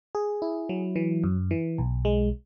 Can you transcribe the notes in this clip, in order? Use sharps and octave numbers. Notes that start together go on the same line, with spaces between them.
G#4
E4
F#3
E3
F#2
E3
B1
G#3